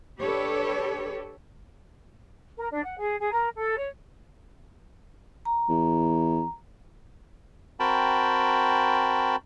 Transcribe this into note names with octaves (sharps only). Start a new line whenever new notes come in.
D4 G4 A4 B4 C#5
A#4
D4
F#5
G#4
G#4
A#4
A4
C#5
A#5
E2
C4 F#4 A#4 G5 A5 B5